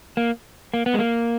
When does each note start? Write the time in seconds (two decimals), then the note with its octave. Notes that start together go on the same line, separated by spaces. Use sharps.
0.17 A#3
0.74 A#3
0.86 B3
0.94 G#3
0.99 A#3